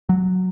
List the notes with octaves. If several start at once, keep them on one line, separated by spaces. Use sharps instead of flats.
F#3